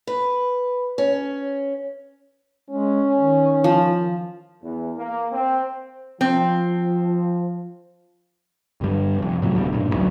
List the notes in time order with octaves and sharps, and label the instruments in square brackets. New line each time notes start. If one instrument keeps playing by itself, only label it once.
[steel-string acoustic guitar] B4
C#4
[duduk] G#3 [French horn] C#4
[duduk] D#3
[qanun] F3
[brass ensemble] E2
A#3
C4
[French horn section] F3 [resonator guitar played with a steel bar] C4
[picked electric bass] G1 G3
F1 F2
A2 C3 F#3
E1 D2 B2 G3
G2 A#2
A1 D2 F#3